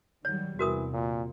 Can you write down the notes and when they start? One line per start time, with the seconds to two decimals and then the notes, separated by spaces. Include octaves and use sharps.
0.25 D#3 F#3 G3 C#5
0.59 E2 C3 E3 F#4 A#4 D#6
0.93 A#2